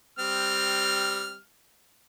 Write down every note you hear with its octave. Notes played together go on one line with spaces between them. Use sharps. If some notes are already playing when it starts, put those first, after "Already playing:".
G3 C4 F6